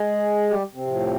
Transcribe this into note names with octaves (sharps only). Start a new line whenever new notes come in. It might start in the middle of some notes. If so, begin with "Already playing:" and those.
Already playing: G#3 G#4
G3 G4
C3 C4
A2 F3